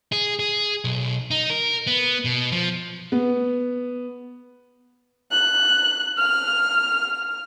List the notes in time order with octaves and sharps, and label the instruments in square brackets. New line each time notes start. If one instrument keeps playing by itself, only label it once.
[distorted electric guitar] G#4
G#4
B1
D#4
A#4
B3
B2
F3
[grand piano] B3
[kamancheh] F#6
F6